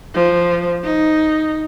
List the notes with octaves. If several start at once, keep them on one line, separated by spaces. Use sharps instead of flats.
F3
D#4